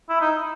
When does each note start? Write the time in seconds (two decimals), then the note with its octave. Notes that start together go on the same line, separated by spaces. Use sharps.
0.09 E4
0.21 D#4